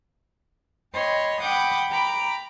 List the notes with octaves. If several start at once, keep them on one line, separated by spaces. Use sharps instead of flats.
C#5 D#5 G5 B5 C6
F#5 G5 B5 D6 D#6 G6
G5 A#5 B5 D6